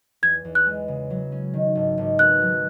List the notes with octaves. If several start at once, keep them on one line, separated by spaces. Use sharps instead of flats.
E2 G#6
E2
F#6
G#3
C#3
F#3
C#4
D#3
G#1
G#1
B3 F#6
F#3